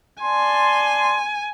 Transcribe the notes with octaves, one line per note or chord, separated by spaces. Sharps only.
D5 G#5 A5 C6